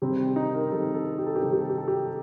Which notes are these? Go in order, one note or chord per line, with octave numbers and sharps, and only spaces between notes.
C3 D#3 G3 C4
D#4
A#4
C3 D#3 G3 C4 A4
A4
G4
A4
G4
C3 D#3 G3 C4 A4
G4
A4
G4
A4
G4